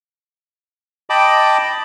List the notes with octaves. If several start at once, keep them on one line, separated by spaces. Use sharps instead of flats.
D#5 G5 A5 B5 D6